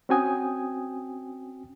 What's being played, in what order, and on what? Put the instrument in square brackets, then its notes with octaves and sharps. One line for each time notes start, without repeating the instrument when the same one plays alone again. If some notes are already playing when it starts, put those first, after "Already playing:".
[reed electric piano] C4 C#4 F#4 G5 G#5 D#6